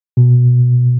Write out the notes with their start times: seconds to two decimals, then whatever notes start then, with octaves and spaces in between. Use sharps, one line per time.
0.17 B2